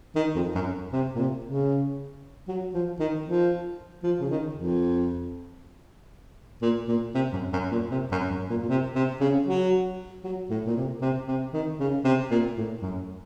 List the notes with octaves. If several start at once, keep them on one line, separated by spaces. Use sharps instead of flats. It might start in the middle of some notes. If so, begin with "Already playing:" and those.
D#3
F2
F#2
C3
A#2
C3
C#3
F#3
F3
D#3
F3
F3
C#3
D#3
F2
A#2
A#2
C3
F#2
F#2
A#2
C3
F#2
F#2
A#2
A#2
C3
C3
C#3
F#3
F#3
A2
A#2
C3
C3
C3
D#3
C#3
C3
A#2
A2
F#2